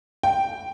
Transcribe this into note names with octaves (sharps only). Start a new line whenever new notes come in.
G5